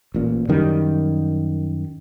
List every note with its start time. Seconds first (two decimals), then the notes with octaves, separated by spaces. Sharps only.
0.14 A1 A#2
0.49 F#2 D#3 G3